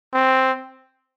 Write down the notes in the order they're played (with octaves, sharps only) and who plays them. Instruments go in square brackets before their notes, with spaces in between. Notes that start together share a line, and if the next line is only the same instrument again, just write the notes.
[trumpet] C4